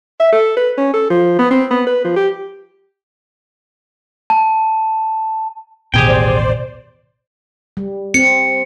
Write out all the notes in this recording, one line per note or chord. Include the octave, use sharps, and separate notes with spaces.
E5
A4
B4
C#4
A4
F3
B3
C4
B3
B4
F3
G4
A5
A1 D#2 B2 G4 G#4 C5 D5 G5
G3
C4 C#7